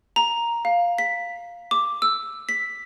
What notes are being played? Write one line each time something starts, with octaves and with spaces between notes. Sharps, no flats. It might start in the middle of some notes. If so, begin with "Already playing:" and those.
A#5
F5
B6
D6
E6
B6